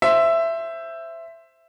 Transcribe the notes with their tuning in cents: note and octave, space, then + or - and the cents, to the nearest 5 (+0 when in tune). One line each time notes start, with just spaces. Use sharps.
C5 +0 E5 +10